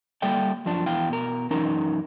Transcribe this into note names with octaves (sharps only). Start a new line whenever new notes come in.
G3 A#3 A4 D5 E5 G5
F#2 F3 D4
E2 E4 F5 G5
B2 A#4
F#2 E3 C#4 D#4 A#4